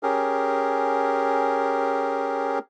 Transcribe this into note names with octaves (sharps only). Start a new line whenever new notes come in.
C#4 G4 G#4 A#4